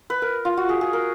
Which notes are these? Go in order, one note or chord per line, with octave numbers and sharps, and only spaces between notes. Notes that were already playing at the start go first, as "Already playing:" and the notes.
B4
A#4
F4
F#4
G#4
G#4
A#4